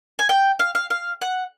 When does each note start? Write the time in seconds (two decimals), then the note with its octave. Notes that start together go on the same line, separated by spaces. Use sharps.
0.19 G#5
0.29 G5
0.59 F5
0.75 F5
0.90 F5
1.21 F#5